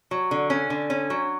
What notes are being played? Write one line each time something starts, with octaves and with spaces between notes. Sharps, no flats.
F#3
D3
C#4
D3
C#4
F#3